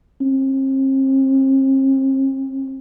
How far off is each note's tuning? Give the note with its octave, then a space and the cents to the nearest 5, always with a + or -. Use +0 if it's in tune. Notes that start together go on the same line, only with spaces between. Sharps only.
C4 +40